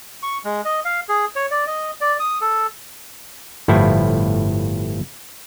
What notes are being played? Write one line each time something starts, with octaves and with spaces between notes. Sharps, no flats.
C#6
G#3
D#5
F5
G#4
C#5
D5
D#5
D5
D#6
A4
G1 A2 F3 E4